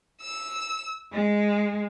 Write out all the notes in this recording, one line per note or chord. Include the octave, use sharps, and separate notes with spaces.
E6
G#3